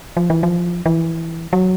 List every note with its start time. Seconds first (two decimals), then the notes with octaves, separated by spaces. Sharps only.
0.17 F3
0.30 E3
0.43 F3
0.86 E3
1.53 F#3